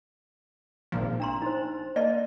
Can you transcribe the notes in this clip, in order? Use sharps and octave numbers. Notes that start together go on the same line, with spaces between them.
G#1 A#2 F3
D4 A#5 C6
D#4 C5
A#3 D5 D#5 A5